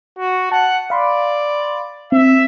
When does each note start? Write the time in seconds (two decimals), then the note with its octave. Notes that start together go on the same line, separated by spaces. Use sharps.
0.18 F#4
0.52 F#5 A5
0.90 D5 F5 B5 C6
2.12 C4 E5